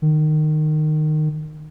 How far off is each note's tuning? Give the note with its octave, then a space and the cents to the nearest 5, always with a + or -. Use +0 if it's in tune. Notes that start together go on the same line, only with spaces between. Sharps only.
D#3 -20